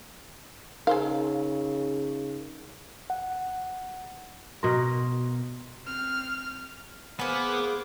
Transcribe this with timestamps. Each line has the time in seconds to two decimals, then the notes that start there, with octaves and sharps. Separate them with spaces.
0.87 C#3 D#4 G#4 A#4 C5 F5
3.10 F#5
4.63 B2 A#4 C6
5.85 C4 F6
7.19 A#3 B3 G#4 C5 D6